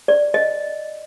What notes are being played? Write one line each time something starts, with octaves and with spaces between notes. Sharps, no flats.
D5
D#5